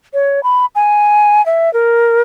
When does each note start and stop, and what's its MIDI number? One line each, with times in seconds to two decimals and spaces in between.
0.14 0.43 73
0.43 0.66 83
0.75 1.44 80
1.46 1.72 76
1.74 2.22 70